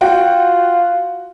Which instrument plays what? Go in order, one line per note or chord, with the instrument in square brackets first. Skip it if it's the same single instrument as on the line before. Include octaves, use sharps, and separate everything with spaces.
[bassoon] F4 [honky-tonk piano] F#4 G5